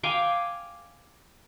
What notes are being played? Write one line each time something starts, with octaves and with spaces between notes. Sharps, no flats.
F5 G5 G#5 D6